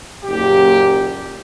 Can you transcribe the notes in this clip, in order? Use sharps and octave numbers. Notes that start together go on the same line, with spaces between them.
F#1 A#2 G4